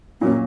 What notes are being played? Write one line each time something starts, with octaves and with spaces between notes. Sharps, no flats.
A#2 F#3 A#3 C#4